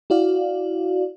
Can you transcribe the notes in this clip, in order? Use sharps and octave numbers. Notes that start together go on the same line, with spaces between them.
E4 F#4 D5 F5